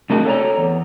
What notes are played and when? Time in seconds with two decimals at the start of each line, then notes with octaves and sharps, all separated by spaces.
0.10 C3 A3 A#3 D#4 F#4 G#4
0.25 A4 C#5 D5 G#5 A#5
0.57 E2